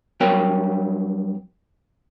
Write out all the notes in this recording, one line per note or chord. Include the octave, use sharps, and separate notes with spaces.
G2 F#3 C4 A#4 C#5 G5